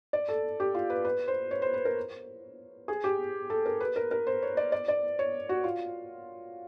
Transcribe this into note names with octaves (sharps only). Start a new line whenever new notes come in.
D5
A4
G4
F4
B4
B4
C5
C#5
C5
B4
A#4
G#4
G4
A4
A#4
B4
A#4
A#4
C5
C#5
D5
D5
D5
C#5
F#4
F4